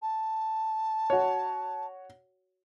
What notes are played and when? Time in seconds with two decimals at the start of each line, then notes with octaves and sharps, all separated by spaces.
0.02 A5
1.10 F#4 C#5